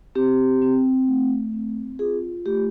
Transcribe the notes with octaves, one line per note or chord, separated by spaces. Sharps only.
C4 G4
C4
A3
C4
F4 G#4
A3 G4